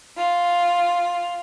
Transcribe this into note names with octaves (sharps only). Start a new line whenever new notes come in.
F4